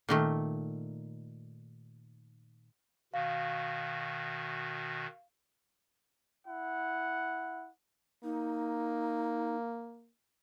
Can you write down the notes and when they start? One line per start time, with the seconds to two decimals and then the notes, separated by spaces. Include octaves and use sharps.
0.09 A#2 D#3 A3
3.14 B2 D#3 F#4 F5
6.46 E4 F#5
8.24 A#3 D#4